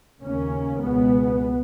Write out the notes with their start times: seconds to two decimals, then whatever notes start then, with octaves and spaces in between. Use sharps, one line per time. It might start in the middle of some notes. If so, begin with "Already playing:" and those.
0.22 D#2 C#3 A#3 C#4
0.81 C#2 B2 G#3 B3